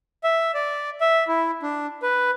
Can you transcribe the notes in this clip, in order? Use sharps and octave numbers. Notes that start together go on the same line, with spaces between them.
E5
D5
E5
E4
D4
B4